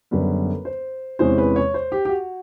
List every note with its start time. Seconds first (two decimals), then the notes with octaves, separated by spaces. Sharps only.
0.11 F#1 F#2 D3 G3 B3 B4
0.65 C5
1.19 E2 C3 E3 G#3 C#4 C5
1.38 B4
1.56 C#5
1.74 C5
1.92 G4
2.05 G4
2.09 F#4